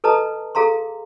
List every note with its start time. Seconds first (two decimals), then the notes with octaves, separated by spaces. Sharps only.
0.04 A4 B4 D#5 A5 A#5 D#6
0.55 G#4 A4 F5 A#5 C6